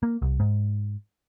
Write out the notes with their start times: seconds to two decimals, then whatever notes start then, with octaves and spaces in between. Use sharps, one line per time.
0.03 A#3
0.22 C2
0.40 G#2